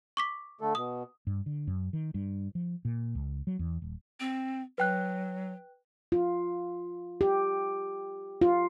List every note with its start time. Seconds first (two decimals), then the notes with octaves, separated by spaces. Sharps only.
0.17 C#6 D6 B6
0.61 D3 A3 A4
0.75 B2 D#6
1.27 G2
1.46 D3
1.67 F#2
1.93 D#3
2.14 G2
2.55 F3
2.85 A#2
3.15 C#2
3.47 F#3
3.59 E2
3.82 D#1
4.20 C4
4.78 F#3 B4 G5 F#6
6.12 F4
7.21 G4
8.41 F4